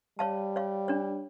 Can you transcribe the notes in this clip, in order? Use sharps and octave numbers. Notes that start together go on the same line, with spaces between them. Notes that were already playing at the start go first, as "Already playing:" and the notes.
G3 C#5 F5 A5
C#5 F5
D4 C#5